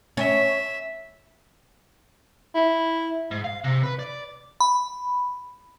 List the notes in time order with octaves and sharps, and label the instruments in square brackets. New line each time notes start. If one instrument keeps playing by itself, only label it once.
[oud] C#4 [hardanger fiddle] E5
[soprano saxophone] E4
[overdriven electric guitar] G#2
F5
C3
B4
D5
[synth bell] B5